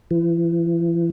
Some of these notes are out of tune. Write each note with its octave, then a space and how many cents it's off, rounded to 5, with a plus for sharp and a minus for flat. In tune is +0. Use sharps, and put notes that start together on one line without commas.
E3 +40